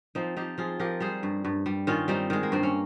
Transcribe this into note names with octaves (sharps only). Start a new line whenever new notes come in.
F3 C4 D#4
F3 D#4 G4
F3 F4 G#4
F3 G4 A#4
G3 G#4 C5
G2
G2
G3
D#3 C#4 F4
G3 C4 D#4
D#3 G#3
A#3
G2 C4
C#4